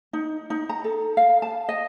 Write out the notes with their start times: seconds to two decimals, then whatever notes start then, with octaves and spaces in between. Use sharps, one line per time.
0.13 D#4
0.50 D#4
0.69 A#5
0.84 A4
1.17 F5
1.42 A5
1.69 D#5